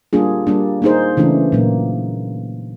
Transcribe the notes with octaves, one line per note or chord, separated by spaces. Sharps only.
G3 A#3 D4 F4 G#4
G3 A#3 D4
A#3 D#4 G#4 C5
C#3 E3 A3 D4
A#2 F#3 A#3